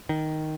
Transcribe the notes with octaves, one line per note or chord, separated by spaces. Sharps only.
D#3